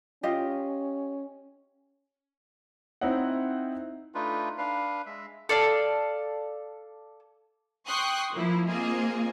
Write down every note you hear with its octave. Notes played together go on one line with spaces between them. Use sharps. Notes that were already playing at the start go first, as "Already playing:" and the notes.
C#4 F4 G4 D#5
C4 D#4 E4 D#5 F#5
A3 D4 D#4 F4 B4
D4 B4 F5
G#3 E5
A4 D5 F5
G5 C6 C#6 D#6 F#6
F3 A#3 E4
A#3 C4 F4 G#4 D#5 G#5